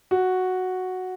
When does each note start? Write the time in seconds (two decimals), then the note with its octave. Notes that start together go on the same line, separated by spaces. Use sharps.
0.11 F#4